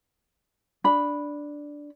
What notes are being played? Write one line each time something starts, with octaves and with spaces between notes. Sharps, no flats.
D4 B5